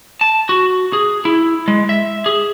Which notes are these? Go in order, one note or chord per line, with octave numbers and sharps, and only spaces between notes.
A5
F#4
G#4
E4
G#3
E5
G#4